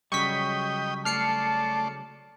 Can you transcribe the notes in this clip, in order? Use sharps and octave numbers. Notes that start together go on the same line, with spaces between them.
C#3 F#3 G3 D#5 G5 C#6 B6
A3 D5 A5 F6 C7 C#7